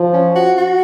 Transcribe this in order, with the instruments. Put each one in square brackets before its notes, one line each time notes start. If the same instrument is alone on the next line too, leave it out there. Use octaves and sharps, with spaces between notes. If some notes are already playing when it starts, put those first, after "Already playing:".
Already playing: [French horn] F3
[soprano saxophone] C#4
F#4
F#4